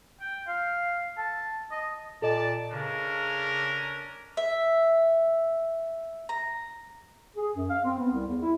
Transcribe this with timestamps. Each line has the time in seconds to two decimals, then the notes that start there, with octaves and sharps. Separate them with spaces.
0.20 G5
0.47 F5
1.18 A5
1.71 D#5
2.22 A#2 A4 D5 D#5 A5
2.71 C#3 C#4 D4 A#4
4.37 E5
6.29 A#5
7.36 G#4
7.55 F#2
7.69 F5
7.84 C4
7.98 B3
8.11 C2
8.27 E2
8.42 E4